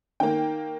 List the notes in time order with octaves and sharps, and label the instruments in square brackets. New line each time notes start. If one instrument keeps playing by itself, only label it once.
[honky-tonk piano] D#3 A#3 G5